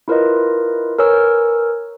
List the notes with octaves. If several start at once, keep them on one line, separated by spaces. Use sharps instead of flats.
E4 F4 A#4 B4 C#5 D#5
A#4 B4 C#5 G#5 E6 F6